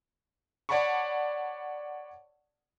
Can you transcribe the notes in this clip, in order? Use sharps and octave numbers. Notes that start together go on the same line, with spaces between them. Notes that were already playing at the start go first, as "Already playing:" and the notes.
C#5 D5 F#5 A5 B5 C#6